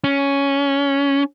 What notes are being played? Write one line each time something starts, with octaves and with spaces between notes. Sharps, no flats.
C#4